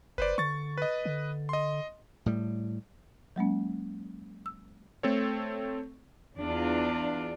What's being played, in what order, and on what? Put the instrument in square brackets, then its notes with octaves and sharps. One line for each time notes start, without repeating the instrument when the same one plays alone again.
[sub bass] F#1 [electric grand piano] B4 C5 D5
[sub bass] D3 [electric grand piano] C#6 A6
[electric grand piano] B4 D#5
[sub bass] D3
[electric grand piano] D#5 C6
[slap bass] A2 G3
[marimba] F#3 G#3 A#3 C#4
E6
[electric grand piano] A3 C4 A4 C#5
[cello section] E2 D4 F4